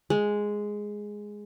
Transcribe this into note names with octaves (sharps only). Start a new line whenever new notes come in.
G#3